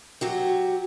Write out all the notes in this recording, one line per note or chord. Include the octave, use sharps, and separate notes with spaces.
F#3 F#4 G4